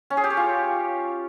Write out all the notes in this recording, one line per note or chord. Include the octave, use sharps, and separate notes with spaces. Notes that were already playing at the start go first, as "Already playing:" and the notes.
C#4
G#4
G4
C#5
F4